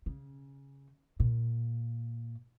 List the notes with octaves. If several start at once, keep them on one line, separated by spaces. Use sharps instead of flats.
C#3
A#2